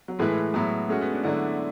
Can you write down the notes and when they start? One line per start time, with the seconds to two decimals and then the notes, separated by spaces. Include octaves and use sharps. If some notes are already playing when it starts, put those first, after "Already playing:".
0.08 F#3
0.19 A2 E3 G#3 A3 E4 B4
0.54 A2 F#3 B3 E4
0.89 G#3 A3 C#4 F#4
1.01 B3
1.12 D4
1.24 D3 F#3 A3 D4 E4